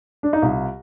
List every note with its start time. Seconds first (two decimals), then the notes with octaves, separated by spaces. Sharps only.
0.23 D4
0.33 D#4
0.42 C2 F4